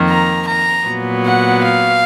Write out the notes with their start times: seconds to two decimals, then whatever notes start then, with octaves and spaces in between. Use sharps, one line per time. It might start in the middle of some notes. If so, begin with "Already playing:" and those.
Already playing: F2 D#3 A#3
0.08 A#5
0.46 A#5
0.86 A#2 F#3 B3
1.24 F#5
1.63 F5